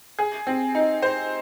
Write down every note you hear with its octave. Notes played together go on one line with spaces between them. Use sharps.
G#4
C4
D#4
C5